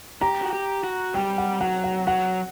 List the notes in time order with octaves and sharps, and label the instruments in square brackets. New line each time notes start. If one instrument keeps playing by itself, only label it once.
[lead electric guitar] G4 [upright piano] A#5
[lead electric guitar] F#4
G4
F#4
[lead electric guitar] G3 [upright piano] G5
[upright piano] F#5
[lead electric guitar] F#3 [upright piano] F#5
[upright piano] F#5
[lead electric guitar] F#3 [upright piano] F#5